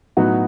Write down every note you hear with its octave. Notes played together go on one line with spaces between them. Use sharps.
A2 F#3 B3 D#4 F#4